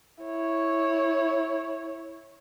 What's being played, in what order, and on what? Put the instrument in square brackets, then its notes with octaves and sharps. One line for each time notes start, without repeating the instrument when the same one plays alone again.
[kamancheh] E4 C#5